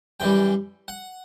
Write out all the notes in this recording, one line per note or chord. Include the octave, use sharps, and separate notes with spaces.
F#2 E3 G3 G5
F#5